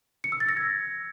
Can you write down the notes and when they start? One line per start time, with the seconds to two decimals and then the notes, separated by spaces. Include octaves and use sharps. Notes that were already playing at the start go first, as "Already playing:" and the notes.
0.24 C#7
0.32 E6
0.40 A6
0.49 A#6
0.57 G#6